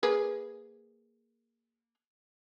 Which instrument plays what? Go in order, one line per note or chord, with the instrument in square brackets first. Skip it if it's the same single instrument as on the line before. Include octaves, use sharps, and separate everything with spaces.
[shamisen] A#3 G#4 B4